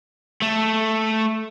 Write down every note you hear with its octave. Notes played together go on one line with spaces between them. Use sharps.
A3